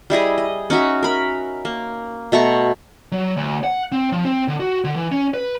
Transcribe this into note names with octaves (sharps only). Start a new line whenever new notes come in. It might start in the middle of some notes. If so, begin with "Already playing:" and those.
G3 E4 G#4 D#5
D#5
C#4 D#4 F#4 E5
A#4 B5
A#3
B2 A3 A#5 C#6
F#3
D2
F#5
C4
F3
C4
D3
F#4
D3
E3
C#4
B4